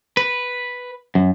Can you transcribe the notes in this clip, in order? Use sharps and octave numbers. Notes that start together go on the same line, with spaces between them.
B4
F#2